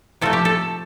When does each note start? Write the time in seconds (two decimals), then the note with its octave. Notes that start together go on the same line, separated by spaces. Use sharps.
0.21 C3 F3 A3 A4
0.33 G4
0.45 A4